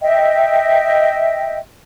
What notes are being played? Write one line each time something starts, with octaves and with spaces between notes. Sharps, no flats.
D#5 E5 G5